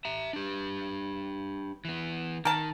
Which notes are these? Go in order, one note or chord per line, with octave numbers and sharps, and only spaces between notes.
E5 A#5
D4 G4
E3 B3
D#3 A#4 A5